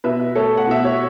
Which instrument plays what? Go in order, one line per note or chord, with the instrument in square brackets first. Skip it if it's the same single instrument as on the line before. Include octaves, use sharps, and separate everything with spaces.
[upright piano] B2 B4 E5
A3 A4 C#5
F#5
B2 E5
C#5